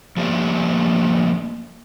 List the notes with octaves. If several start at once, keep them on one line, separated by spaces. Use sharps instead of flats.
F3 G3 A3 A#3 D5 E5